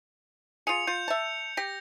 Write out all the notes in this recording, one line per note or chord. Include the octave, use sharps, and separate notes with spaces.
F4 G#4 C#7 F7
F4 G6
E5 A5
G4 A#6